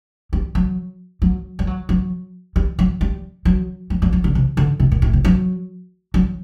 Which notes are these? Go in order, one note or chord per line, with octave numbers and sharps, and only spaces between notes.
G3
F#3
F#3
G3
F#3
F#3
G3
F#3
G3
F#3
F#3
F#3
F#3
D3
C3
D3
C3
A#2
A2
C3
F#3
F#3